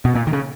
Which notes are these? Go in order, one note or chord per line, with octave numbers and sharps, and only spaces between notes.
B2
A#2
D#3
C#3